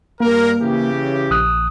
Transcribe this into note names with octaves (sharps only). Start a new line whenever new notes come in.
G2 A#3 A#4
C#3 E3 G4
A#1 D#6 F#6